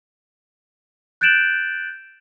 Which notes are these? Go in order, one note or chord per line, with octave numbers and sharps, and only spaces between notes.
F#6 G6 A6 D7 E7 F#7